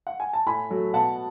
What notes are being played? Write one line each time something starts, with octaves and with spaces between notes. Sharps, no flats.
F#5
G#5
A5
A2 G#5 B5
F#3 A3
B2 F#5 A5